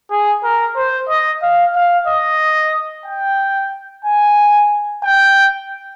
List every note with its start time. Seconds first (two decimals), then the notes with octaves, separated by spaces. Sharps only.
0.11 G#4
0.44 A#4
0.76 C5
1.09 D#5
1.42 F5
1.75 F5
2.08 D#5
3.06 G5
4.05 G#5
5.04 G5